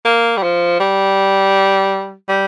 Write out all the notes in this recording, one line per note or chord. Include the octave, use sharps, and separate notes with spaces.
A#3
G3
F3
G3
G3